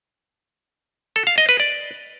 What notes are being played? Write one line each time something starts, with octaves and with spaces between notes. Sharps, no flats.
A4
F5
D#5
B4
D5